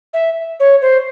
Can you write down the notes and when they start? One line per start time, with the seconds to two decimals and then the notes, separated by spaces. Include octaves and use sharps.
0.14 E5
0.60 C#5
0.82 C5